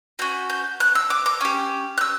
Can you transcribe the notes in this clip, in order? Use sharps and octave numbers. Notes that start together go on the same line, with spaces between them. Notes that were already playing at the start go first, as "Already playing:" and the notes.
C#4 F#4 G6
G6
F#6
E6
D6
D6
C#4 G4
F#6
E6